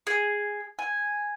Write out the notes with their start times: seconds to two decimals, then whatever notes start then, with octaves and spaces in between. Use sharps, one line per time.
0.07 G#4
0.79 G#5